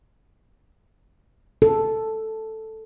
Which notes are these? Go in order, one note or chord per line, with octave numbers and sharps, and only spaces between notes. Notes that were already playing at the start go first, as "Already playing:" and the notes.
A4